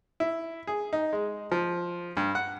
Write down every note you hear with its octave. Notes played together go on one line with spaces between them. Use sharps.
E4
G#4
D#4
G#3
F3
G2
F#5